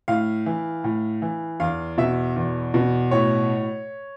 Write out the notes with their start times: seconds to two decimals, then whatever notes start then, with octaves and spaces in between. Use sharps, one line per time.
0.08 A2 F5
0.46 E3
0.84 A2
1.22 E3
1.60 E2 F5
1.98 B2 E5
2.36 E2
2.74 B2
3.11 A2 C#5